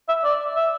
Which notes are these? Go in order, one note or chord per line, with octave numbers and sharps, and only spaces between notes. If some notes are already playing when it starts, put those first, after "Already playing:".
E5
D5
E5